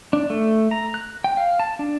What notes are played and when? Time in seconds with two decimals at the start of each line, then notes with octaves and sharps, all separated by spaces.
0.13 D4
0.30 A3
0.71 A#5
0.94 F#6
1.24 G5
1.37 F5
1.60 A5
1.79 D4